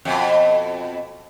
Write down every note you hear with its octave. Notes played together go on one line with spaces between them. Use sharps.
F2 B2